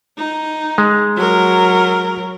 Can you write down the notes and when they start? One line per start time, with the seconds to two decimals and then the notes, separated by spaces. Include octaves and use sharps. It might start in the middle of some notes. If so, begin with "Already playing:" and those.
0.17 D#4
0.78 G#3
1.17 F#3 A#4